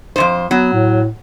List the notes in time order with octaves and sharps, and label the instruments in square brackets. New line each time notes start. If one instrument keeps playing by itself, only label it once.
[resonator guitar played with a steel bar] F2 C3 C5
[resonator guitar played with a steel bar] F#3 [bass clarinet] B3
[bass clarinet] A2